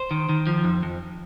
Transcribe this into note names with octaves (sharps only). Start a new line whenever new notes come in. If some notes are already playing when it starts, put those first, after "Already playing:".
Already playing: C5
D#3
D#3
F3
F2
F2